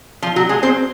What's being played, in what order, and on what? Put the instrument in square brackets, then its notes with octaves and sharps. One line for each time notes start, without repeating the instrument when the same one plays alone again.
[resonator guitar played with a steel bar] F3 F4
F#3 F#4
G#3 G#4
C4 C5